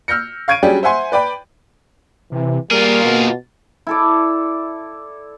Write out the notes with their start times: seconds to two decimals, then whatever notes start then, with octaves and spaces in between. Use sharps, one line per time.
0.08 E6 F6 G6 A#6 C#7
0.48 F5 C#6 G#6 D7 D#7
0.63 F#3 G3 C#4 D4 G4 G#4
0.83 C5 E5 F#5 G#5 C6
1.12 B4 D5 G5 B5
2.32 C3 E3
2.71 G3 A#3 F4 G#4 A#4
3.04 B2
3.87 E4 A4 D5